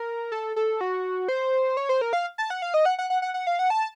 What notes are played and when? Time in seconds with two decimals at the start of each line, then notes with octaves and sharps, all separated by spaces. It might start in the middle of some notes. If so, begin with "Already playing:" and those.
Already playing: A#4
0.32 A4
0.56 A4
0.81 F#4
1.28 C5
1.77 C#5
1.89 C5
2.01 A#4
2.13 F5
2.38 A5
2.50 F#5
2.62 F5
2.74 D#5
2.85 F#5
2.99 F#5
3.10 F#5
3.22 F#5
3.34 F#5
3.47 F5
3.59 F#5
3.70 A5